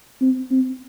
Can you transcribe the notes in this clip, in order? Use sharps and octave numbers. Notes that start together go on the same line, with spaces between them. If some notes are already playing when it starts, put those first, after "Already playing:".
C4
C4